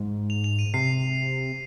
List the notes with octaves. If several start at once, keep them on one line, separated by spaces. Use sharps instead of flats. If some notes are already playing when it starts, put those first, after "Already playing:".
Already playing: G#2
F7
F7
D#7
C3 C7